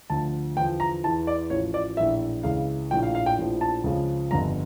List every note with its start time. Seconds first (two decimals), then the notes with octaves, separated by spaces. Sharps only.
0.10 D2 D3 F3 A5
0.56 E2 D3 F3 G5
0.80 A#5
1.04 E2 E3 A5
1.27 D5
1.50 A1 A2 F3 C#5
1.74 D5
1.97 A#1 A2 E3 E5
2.43 C#2 C#3 E3 F5
2.91 A#1 A2 F3 G5
3.03 F5
3.15 F5
3.26 G5
3.38 A#1 A2 F3
3.61 A5
3.84 C#2 C#3 F3
4.31 G1 F2 D3 A#5